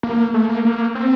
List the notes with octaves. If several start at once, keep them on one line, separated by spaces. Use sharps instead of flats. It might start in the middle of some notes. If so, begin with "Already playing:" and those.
A#3
A3
A#3
A#3
C4